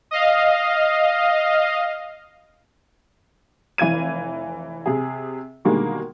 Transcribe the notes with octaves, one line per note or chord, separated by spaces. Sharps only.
D#5 F5
F1 E3 F5 G#6 D#7
C3 G#4
B2 D3 D#3 G3 G#3 A#3